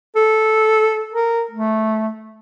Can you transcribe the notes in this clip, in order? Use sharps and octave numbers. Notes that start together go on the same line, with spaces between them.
A4
A#4
A3